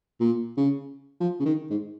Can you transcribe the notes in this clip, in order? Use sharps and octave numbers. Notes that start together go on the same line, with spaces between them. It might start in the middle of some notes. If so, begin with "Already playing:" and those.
A#2
C#3
F3
C#3
D#3
G#2